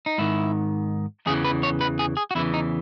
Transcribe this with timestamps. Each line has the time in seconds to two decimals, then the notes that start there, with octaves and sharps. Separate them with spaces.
0.06 D#4
0.18 G#2 D#3 E4
1.26 E2 C#3 E3 G#4
1.45 B4
1.63 C#5
1.81 B4
1.99 G#4
2.17 G#4
2.31 F#4
2.35 E2 C#3 E3 E4
2.54 D#4